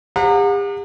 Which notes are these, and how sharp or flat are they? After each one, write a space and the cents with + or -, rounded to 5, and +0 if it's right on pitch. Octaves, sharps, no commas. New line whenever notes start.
G4 +45 F#5 -35 A#5 -25